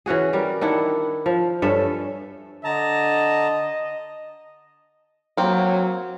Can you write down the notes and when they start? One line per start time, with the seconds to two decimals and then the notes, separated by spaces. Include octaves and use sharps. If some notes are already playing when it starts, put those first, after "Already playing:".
0.06 E3 C#4 F#4 G#4
0.33 G3 A#4
0.61 D#3 D4 E4 F#5
1.26 F3
1.62 G2 C#4 A4 E5
2.64 D3 D#5 A5 A#5
5.37 F#3 A#3 C4